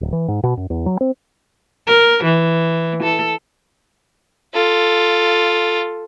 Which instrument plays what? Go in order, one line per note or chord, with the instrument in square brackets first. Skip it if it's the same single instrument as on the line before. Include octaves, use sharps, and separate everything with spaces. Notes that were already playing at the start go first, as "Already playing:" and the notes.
[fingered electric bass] D1
E3
G#2
B2
F#2
E2
F#3
C4
[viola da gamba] A#4
E3
A4
[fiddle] F4 A4